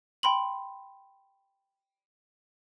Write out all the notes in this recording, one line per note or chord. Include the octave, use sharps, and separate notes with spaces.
G5 B5 C6 F#7